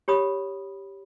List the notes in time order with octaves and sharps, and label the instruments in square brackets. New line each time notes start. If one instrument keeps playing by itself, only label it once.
[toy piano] G4 C#5 B5 D#6